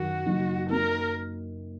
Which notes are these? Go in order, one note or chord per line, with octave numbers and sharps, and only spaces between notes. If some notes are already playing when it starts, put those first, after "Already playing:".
Already playing: F#2 D#3 F#3 F#4
F#1 F#2 F#3 D#4
F#2 F#3 A#3 D#4 A#4